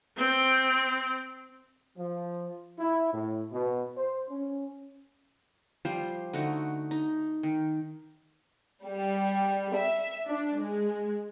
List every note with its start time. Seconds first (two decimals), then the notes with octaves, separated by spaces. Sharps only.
0.17 C4
1.96 F3
2.78 E4
3.12 A2
3.51 B2
3.97 C5
4.30 C#4
5.85 F3 G3 C5
6.33 D3 A3 D#4 F#4
6.91 D#4
7.43 D#3
8.86 G3
9.74 E5
10.28 D4
10.60 G#3